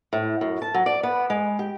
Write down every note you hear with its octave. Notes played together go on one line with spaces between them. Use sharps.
A2
F#2
A5
F#3
D5
B3
G#3
G4